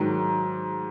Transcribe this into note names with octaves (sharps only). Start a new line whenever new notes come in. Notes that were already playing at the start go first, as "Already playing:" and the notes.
Already playing: G#2 D#3 F#3